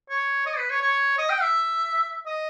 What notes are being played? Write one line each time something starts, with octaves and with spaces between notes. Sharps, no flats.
C#5
D#5
B4
C#5
C#5
D#5
G5
E5
D#5